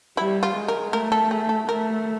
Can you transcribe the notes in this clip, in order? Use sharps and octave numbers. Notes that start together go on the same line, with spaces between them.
G3 E4
F4
G#3
A#4
A3 A#4
A4
G#4
A4
A3 A#4